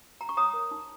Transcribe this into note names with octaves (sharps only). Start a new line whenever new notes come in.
A#5
C#6
C#5 A#5 D#6
A#4
D#4